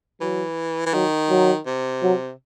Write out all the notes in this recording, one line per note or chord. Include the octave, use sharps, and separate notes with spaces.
E3 F#3
E3
D#3 F#3
F#3
C3
F#3